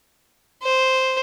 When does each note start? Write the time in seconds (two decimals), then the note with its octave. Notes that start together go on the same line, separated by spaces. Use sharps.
0.63 C5